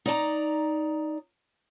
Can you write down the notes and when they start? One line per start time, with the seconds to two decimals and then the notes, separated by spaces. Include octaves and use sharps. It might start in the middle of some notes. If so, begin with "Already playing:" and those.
0.06 D#4 D5 A5 A#5